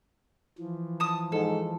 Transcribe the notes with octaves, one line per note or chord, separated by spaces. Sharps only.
E3 F3
A5 D#6
G#2 A4